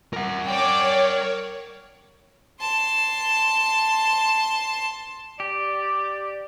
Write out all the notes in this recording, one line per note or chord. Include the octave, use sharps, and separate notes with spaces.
A#4 F#5
C#5 D5 G5
A5 C6
G4 D5